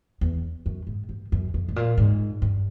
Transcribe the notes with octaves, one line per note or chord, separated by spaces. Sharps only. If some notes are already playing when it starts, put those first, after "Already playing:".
E2
F#2
G#2
G2
F#2
F2
A2
A#2
G#2
G2